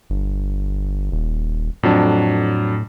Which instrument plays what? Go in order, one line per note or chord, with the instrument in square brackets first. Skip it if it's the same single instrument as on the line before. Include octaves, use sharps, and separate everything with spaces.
[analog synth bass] G1
D#1
[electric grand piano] F2 F#3 D4 [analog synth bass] A2